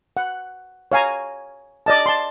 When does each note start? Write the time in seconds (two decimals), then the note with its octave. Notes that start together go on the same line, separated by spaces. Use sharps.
0.17 F#5
0.92 C#5 F5 G#5 A#5
1.86 D5 D#5 A5
2.06 A5 C6